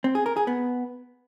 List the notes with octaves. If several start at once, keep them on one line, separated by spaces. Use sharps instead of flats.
C4
G#4
A#4
G#4
B3